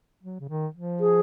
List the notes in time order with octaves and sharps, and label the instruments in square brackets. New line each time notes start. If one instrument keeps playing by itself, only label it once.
[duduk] F#3
C#3
D#3
F3
[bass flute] G#4